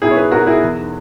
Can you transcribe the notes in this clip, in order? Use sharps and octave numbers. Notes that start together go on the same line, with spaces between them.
B1 E4 G#4
C#5
G#4 B4
B1 F#4 A#4
E4 G#4
E2